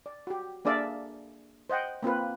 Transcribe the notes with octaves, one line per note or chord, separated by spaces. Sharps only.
D5
F#4 G4
A#3 D4 G#4 D5 E5 F5
C5 D#5 F#5 G5
A#3 C4 F4 B4